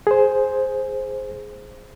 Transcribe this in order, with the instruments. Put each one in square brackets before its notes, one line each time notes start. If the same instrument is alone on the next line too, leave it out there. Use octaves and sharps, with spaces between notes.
[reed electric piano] G#4 C5